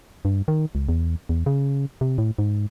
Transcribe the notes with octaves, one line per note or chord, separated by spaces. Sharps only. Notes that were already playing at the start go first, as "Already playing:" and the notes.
G2
D#3
C#2
E2
E2
C#3
C3
A2
G#2